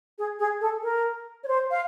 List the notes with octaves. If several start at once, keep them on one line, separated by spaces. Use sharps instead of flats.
G#4
G#4
A4
A#4
C#5
C5
F5